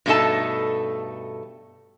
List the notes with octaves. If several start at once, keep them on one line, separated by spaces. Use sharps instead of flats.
G2 B2 A3 D#4 A4 A5